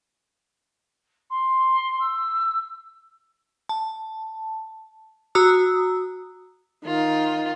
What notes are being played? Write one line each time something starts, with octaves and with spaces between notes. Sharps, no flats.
C6
E6
A5
F#4 A#5 D#6 E6
D#3 F4